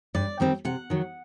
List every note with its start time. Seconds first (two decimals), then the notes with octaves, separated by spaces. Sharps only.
0.14 G2 D5
0.40 D#3 G3 C4
0.65 C3 F#5
0.90 D#3 F#3